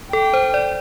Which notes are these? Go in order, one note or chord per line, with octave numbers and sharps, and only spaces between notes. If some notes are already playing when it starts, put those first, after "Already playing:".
A4 G5
C5
D5